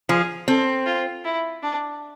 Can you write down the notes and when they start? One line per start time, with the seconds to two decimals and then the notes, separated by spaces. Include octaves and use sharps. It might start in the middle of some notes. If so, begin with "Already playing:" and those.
0.09 F3 G#4
0.47 C4 A4
0.86 F4
1.24 E4
1.63 D4